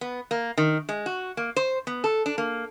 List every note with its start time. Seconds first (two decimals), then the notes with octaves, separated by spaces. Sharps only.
0.01 B3
0.31 A#3
0.58 D#3
0.89 G#3
1.06 F#4
1.37 A#3
1.56 C5
1.87 B3
2.04 A4
2.26 D4
2.38 A#3